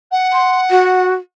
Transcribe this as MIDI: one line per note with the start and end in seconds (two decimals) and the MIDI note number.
0.11 1.06 78
0.33 0.59 84
0.70 1.13 66